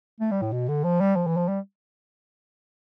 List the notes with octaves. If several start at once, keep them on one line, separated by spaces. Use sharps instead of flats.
A3
G3
A2
B2
D3
F3
G3
F3
E3
F3
G3